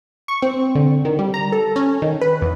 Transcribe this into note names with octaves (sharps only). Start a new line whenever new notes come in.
C#6
C4
D3
D#3
G3
A#5
A4
C#4
D#3
B4
E2